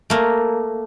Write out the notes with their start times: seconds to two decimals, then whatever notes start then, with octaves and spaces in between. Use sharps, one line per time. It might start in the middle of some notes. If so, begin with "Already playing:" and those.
0.10 A3 A#3